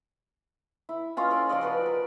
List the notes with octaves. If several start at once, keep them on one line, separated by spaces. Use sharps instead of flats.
E4
C#4 F4 D#5 F5
A4 D5 G#5
F3 F4 D5 D#5
F#4 B4 D5
A#4